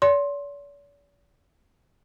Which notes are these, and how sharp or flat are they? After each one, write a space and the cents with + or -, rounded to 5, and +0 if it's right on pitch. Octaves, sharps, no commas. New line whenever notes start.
D5 -45 C6 +15